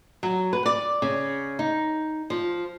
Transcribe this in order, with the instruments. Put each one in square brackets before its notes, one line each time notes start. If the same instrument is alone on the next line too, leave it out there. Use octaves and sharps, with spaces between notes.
[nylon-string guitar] F#3
B4
D5
C#3
D#4
F3